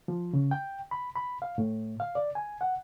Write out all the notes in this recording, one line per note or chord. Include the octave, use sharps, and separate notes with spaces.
F3
C#3
G5
B5
B5
F5
A2
F5
D5
G#5
F#5